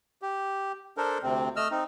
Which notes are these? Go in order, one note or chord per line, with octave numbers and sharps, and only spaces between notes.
G4
D4 A4 A#4 C5
D2 C3 C4
A3 D#5 E6 F6
C4 D#4